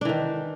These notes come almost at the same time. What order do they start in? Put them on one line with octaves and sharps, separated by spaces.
D4 E3 D#3